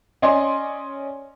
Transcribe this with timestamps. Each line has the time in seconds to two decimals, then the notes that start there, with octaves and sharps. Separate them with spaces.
0.22 C#4 D5 D#5 G#5 C6